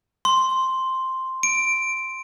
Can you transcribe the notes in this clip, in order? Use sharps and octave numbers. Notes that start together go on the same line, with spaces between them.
C6
D7